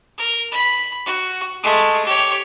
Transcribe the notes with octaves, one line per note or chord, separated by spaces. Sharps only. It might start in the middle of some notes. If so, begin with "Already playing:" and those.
A#4
B5
F#4
G#3 A3
G4 C#5